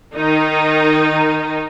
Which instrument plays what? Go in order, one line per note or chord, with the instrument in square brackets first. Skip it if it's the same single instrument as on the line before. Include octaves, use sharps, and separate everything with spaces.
[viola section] D#3 D#4